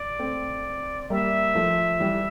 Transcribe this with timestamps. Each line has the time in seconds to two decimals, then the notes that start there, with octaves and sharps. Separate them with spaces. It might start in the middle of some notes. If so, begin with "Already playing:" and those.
Already playing: D5
0.19 A3 C4
1.10 G3 A#3 E5
1.55 F3 A3
2.00 E3 G3